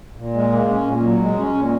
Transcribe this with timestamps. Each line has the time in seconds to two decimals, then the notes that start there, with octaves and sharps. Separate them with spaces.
0.17 A#2
0.35 G#3
0.51 A#3
0.69 C#4
0.86 A#2
1.03 F#3
1.21 G#3
1.38 C#4
1.55 A#2